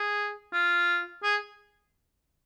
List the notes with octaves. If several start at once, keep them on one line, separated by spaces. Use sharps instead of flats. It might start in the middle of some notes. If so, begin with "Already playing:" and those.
Already playing: G#4
F4
G#4